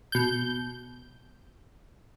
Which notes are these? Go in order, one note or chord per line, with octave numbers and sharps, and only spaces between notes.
B2 G6